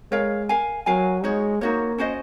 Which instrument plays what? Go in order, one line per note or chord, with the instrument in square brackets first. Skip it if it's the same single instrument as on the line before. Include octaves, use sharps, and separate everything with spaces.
[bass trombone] G#3 [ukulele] A#4 C#5 F5
[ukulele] A#4 F5 G#5
[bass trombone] F#3 [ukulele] A#4 F5 G#5
[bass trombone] G#3 [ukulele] D#4 F#4 C#5
[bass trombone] A#3 [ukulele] D#4 F#4 C#5
[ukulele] C#4 F#4 C5 D#5